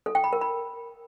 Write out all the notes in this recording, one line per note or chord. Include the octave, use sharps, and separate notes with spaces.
A4
G5
B5
A#4
B5